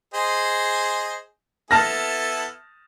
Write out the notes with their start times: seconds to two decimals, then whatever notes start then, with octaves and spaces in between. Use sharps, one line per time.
0.14 G#4 C5 D#5
1.71 B3 E4 A4 A5 F6 A#6